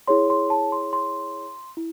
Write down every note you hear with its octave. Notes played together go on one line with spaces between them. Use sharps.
E4 G#4 C#5 C6
C6
A5
C6
C6
E4